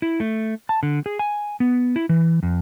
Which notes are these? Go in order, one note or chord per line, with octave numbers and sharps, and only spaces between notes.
E4
A3
A5
D3
G#4
G#5
B3
E4
E3
F2